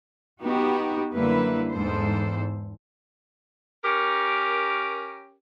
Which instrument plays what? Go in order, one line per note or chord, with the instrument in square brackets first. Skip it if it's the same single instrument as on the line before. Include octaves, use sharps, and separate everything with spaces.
[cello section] B3 D#4 F#4 G4
F#2 D3 G3 A#3 E4 B4
E2 G#2 A4 C5
[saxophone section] C#4 G4 A#4